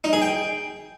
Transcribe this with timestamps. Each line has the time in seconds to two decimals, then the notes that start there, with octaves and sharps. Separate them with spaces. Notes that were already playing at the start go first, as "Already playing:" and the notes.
0.04 D#4
0.13 G#4
0.22 G5